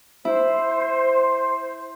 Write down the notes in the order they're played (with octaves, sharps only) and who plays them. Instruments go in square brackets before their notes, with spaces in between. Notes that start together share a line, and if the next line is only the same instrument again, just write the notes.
[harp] E4 [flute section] C5